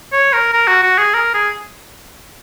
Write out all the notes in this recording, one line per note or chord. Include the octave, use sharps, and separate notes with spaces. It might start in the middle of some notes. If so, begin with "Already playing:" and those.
C#5
A#4
A#4
F#4
F#4
G#4
A#4
G#4